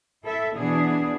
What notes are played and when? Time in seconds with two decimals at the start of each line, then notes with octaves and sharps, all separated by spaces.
0.24 E4 A4 E5
0.55 B2 E3 B3 D4 G#4